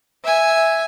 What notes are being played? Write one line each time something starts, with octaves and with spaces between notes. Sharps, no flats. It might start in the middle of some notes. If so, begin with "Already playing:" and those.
E5 G#5